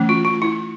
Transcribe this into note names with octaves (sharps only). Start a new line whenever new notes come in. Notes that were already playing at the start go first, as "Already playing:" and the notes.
Already playing: E3 A3 C#4
F4
F4
E4